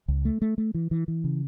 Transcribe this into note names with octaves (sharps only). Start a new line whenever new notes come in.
C#2
A3
A3
A3
E3
E3
E3
C#3